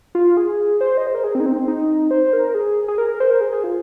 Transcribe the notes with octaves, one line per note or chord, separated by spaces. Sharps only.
F4
G#4
C5
D#5
C5
A#4
G#4
C4
D#4
C4
C4
D#4
C5
A#4
G#4
G#4
A#4
A#4
C5
A#4
G#4
G#4
F4